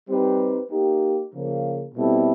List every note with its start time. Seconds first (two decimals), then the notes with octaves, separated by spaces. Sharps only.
0.08 G3 C4 D#4 G4 B4
0.70 A#3 D#4 G4
1.32 C#3 F3 A#3
1.95 B2 G3 C4 E4 A4